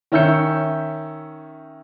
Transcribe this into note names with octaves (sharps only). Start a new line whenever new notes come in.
D#3 C#4 E5 E6 G6 C#7